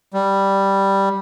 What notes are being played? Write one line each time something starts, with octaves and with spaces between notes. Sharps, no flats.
G3